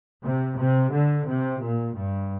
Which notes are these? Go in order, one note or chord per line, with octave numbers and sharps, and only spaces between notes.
C3
C3
D3
C3
A#2
G2